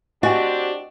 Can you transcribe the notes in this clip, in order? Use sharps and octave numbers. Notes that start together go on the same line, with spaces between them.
C4 D4 F#4 G4 D#5 G#5